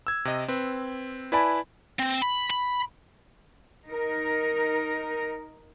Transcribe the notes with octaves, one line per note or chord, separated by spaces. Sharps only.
E6 G#6
C3 D#5
C4 B4
E4 B4 D5 G#5 A5 B5
C4
B5
B5
D#4 A#4